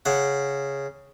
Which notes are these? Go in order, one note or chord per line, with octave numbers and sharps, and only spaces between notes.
C#3 F#5